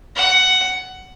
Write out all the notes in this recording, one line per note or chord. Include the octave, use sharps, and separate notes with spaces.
F#5